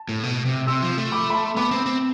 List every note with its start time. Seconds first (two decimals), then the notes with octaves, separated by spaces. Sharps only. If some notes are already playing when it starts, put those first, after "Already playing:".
Already playing: A5
0.09 A2
0.23 B2
0.46 C3
0.67 C3 C6 E6
0.82 F3
0.97 A3
1.12 B5 D6
1.30 B5
1.34 A5 C6
1.57 B3 B5 D6
1.71 C4
1.86 C4